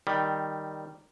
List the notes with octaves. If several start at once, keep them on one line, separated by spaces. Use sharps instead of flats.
D#3 G3